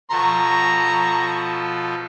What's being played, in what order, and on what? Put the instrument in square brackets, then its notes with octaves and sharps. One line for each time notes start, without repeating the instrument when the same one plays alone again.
[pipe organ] B2 F3 A4 [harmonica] A#5 C#6